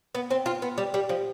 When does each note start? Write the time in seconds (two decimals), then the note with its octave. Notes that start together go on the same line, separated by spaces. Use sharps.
0.15 B3
0.31 C4
0.46 F4
0.62 B3
0.78 G3
0.94 G3
1.09 F3